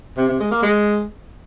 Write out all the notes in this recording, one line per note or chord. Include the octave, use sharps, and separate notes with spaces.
C3
C3
G#3
A#3
G#3